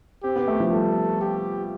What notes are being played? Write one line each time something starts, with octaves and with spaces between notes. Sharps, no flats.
C4 G4
B3
A3
F3
G3 A4
G4